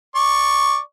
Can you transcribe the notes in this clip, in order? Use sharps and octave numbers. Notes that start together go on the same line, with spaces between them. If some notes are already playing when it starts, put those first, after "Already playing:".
D5 C#6